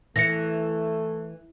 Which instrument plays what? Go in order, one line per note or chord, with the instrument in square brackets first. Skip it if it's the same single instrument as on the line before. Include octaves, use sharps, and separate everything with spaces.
[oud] E3 [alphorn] A3 [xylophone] A#6 C#7